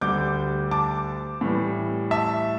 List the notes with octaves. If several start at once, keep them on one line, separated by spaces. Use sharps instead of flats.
D2 D3 G3 D6 G6
A5 D6
A2 E3 G3
E5 A5